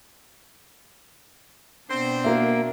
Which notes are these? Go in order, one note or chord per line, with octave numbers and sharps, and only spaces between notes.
B2 B3 C4 D4 C5
A#3 F#4 A#4 E5